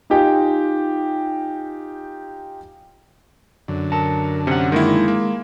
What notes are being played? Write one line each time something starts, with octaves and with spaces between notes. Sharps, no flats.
D#4 F4 G4 G5 G#5
F#2 D3
A#4 A5
C3 C#4 F#5
D#3 G#3 A#3 E4
A#3